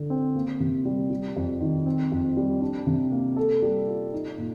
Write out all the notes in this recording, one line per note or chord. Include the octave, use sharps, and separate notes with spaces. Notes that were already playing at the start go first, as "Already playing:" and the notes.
Already playing: D3
C4
A#3
C3
G3
G3
F2
D#3
C4
F2
G3
D4
C3
A#3
A4
G3
F4
D#4
A#2